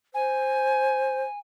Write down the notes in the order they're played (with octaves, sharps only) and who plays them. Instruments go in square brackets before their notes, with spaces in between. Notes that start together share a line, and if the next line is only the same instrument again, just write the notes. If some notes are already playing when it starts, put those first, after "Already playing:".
[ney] C5 [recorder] G#5